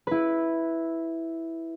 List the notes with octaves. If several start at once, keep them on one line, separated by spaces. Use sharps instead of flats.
E4 B4